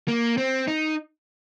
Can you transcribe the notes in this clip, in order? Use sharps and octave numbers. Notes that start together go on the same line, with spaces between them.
A#3
C4
D#4